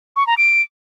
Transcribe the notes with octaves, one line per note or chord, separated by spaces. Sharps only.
C#6
A#5
D7